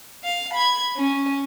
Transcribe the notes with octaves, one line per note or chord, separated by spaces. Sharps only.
F5
B5 G#6
C#4